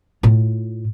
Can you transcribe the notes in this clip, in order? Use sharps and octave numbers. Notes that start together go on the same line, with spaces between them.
A2 F4